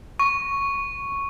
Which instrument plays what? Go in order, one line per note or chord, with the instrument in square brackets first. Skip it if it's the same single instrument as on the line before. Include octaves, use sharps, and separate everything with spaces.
[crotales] C#6